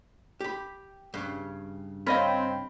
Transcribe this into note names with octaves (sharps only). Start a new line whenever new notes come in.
G4 B5
G2 C#3
C4 C#5 D#5 F5 B5 F6 B6